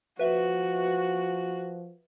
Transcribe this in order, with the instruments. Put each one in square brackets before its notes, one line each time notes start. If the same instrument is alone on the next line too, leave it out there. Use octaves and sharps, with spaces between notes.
[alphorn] F3 [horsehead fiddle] F#4 [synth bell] B4 E5